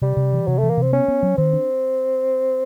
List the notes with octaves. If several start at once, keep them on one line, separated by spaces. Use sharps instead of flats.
C3 G3
C3
E3
C3 F#3
E3 A3
A#3
C3 C4
B3 C#4
B3
F#3
D#3 C4
D4